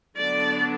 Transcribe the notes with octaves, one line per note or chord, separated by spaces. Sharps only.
D3 F#3 B3 D4 D5